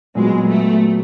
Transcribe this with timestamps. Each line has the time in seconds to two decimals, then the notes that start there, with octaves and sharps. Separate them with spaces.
0.15 A#2 F#3 G#3 B3
0.48 A3